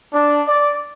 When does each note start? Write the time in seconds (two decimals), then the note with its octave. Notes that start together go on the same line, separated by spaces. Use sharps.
0.14 D4
0.48 D5